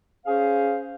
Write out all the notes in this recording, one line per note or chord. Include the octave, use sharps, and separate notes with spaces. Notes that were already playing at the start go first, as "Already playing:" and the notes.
C#4 G#4 C5 F5